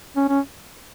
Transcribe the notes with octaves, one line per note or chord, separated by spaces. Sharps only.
C#4
C#4